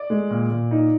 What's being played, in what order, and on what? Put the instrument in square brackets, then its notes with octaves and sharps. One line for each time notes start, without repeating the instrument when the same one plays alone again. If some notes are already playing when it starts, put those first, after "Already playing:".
Already playing: [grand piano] D5
G#3
A#2
A#2
D#4